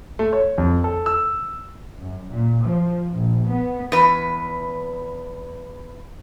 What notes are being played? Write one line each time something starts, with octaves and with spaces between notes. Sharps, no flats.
A3
C#5
F2
A4
E6
F#2
A#2
F3
A#1
B3
E2 B4